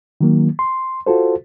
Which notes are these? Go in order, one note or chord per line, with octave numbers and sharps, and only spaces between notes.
D#3 F#3 A#3
C6
F4 F#4 A4 C5